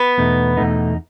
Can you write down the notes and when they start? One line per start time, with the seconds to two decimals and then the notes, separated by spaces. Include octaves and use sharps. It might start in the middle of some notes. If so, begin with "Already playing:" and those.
Already playing: B3
0.18 E2 B2 A3 D#4
0.57 E2 B2 A3 D#4